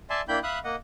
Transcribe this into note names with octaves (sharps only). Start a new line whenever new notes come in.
D5 E5 G#5 A5 C6
A#3 D4 E4 G5 B5 G6
E5 F5 B5 D#6 F#6
A#3 D#5 F#5